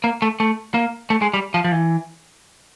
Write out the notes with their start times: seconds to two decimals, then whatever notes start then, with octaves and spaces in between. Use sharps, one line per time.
0.04 A#3
0.22 A3
0.40 A3
0.74 A#3
1.10 A3
1.22 G#3
1.34 G3
1.54 F3
1.64 F3
1.72 E3